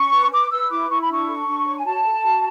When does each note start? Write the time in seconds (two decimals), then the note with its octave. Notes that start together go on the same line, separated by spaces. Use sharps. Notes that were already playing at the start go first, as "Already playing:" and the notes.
Already playing: C#4 C#6
0.12 B4
0.31 B4 D6
0.50 B4 E6
0.69 E4 D6
0.89 E4 C#6
1.01 B5
1.08 D4 C#6
1.27 A4
1.47 D4
1.66 C#5
1.77 G#5
1.85 F#4 A5
2.04 A4
2.23 F#4